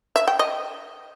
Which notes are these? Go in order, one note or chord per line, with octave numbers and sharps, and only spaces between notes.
E5
G5
D#5